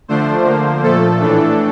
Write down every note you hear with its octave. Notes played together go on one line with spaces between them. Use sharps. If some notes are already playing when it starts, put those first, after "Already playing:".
D3 F3 A3 D4 C5
D3 F3 A#3
A#2 F3 A3 A4
A2 E3 A3 D4